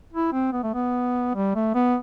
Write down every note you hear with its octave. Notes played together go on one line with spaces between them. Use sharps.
E4
C4
B3
A3
B3
G3
A3
B3